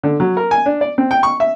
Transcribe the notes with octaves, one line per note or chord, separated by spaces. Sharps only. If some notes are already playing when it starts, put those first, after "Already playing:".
D3
F#3
A#4
G#5
D4
D5
C4
G5
C#6
E5